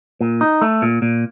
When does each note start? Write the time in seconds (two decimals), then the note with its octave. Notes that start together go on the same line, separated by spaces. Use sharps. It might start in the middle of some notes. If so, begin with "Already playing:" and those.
0.21 A#2
0.41 D#4
0.62 A3
0.82 A#2
1.02 A#2